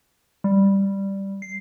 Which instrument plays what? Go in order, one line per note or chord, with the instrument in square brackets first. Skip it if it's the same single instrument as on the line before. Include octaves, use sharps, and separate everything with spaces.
[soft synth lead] G3
C7